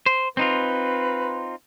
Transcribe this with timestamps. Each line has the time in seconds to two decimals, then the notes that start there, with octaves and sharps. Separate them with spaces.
0.06 C5
0.37 C4 D#4 F4 B4